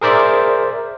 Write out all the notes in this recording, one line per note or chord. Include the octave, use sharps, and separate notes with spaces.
G#4 A#4 C5 D5 E5